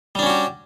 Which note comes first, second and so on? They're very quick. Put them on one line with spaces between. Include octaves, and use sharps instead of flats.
G3 D4 C#4 F#4 G4